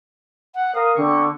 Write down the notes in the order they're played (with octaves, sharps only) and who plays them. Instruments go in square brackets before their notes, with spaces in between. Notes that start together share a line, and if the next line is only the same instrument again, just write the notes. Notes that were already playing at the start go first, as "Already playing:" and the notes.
[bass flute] F#5
[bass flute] A#4 [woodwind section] F5 D#6
[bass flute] D3 [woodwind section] B3 C4 C#6